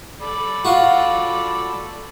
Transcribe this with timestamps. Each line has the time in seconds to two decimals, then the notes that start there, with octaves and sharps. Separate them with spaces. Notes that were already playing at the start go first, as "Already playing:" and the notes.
0.22 A4 D5 B5
0.65 F4 F#4